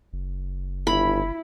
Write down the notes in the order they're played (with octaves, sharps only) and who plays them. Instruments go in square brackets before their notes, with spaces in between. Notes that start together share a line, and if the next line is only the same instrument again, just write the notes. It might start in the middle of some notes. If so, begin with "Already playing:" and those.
[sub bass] F#1
[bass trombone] G1 [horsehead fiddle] E4 [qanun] B5